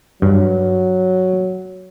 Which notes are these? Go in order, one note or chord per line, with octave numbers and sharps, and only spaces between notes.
G2 F#3